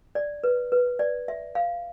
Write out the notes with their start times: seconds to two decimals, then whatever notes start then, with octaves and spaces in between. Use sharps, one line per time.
0.15 D5
0.44 B4
0.72 B4
0.99 D5
1.28 E5
1.55 F5